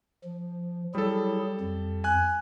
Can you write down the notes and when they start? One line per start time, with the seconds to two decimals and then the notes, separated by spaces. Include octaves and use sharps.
0.24 F3
0.95 F#3 G3 E4 G#4 A4
1.60 F2
2.04 G#5 F#6